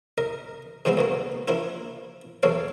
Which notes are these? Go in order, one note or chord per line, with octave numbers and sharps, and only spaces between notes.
A#4 D#5
G#2 F3 G3 G#3 B3 C4
D2 B2 A#3
F3 A#3 D4 E4 F4
B1 E2 A#3 A4 C#5 F5